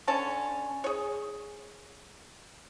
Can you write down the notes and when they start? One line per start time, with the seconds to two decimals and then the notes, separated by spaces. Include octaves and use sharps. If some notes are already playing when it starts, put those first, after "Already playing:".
0.07 D3 C#4 A5
0.84 G#4 C#5